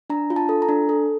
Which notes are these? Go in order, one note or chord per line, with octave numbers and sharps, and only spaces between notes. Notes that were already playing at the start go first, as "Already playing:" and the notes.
D4 A#5
F4
A5
A4
A#5
D4
A4